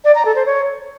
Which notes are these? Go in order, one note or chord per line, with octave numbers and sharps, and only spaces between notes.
D5
A#5
A4
C5
C#5